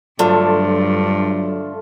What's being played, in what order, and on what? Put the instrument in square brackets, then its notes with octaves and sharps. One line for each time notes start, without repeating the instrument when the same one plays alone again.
[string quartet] G2 [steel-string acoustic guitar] D3 [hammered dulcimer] F3 A3 F4 [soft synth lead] F#3